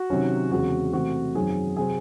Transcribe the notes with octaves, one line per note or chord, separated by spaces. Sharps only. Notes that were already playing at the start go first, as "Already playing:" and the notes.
Already playing: F#4
C3 D#3 F#3 C#4
E2 C#3 G#3 C4 F#4
C3 E3 A3 C4 F#4
F#2 D#3 F#3 C4 G#4
C3 F#3 C4 G#4